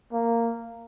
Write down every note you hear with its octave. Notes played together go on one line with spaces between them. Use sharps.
A#3